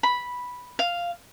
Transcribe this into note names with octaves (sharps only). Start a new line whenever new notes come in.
B5
F5